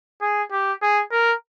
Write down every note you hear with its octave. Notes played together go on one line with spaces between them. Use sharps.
G#4
G4
G#4
A#4